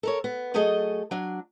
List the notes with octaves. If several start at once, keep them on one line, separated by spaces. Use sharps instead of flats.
A4 A#4 C#5
B3
F#3 A3 G#4 A4 D#5
F#3 D4